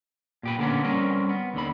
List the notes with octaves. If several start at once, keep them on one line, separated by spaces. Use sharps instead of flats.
A#2 G4 B4
D3 A#3 B3 C#4
G3 C4 C#4 A#4 B4
B3
D#2 D3 B5